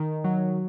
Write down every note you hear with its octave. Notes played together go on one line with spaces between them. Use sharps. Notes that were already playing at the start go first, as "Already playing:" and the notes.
Already playing: D#3
F#3